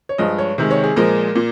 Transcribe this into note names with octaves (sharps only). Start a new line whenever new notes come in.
C#5
G2 F3 G#3 D#5
C#5
C3 D#3 G#3
C#5
G#4
A#2 F3 G#3 A#4
A#2